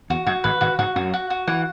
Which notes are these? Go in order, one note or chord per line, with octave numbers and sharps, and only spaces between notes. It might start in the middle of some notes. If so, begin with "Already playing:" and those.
E2 F#4
F#2 F#4
G#1 G#2 B4
G#1 G#2 F#4
G#2 G#3 F#4
F#2 F#3 F#4
F#4
F#4
E3 F#5